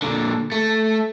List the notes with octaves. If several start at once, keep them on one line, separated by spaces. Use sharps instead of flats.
A#2 D3
A3